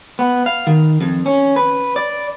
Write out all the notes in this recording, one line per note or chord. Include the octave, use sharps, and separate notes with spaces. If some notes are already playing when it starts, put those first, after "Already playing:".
B3
F5
D#3
F2
C#4
B4
D5